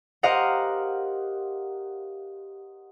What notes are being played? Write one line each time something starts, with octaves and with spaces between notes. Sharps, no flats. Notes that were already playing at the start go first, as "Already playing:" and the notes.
G4 A#4 C5 D#5 F5 F#5